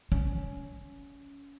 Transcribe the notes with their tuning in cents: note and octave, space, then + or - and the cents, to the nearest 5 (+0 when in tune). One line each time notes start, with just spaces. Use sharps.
C#4 +20